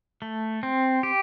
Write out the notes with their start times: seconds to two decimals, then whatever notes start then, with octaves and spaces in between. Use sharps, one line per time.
0.22 A3
0.63 C4
1.03 G4